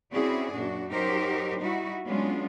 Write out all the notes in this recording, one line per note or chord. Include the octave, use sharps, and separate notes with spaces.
C4 C#4 E4 F#4 G#4 D5
F#2 A#2 D4 F#4
F#3 D#4 G4 A#4 C5
G3 D#4 E4 F#4
F#3 G#3 B3 C#4 D4 F4